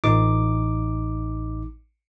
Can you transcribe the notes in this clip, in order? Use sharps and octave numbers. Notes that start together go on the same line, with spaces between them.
A1 D#4 D6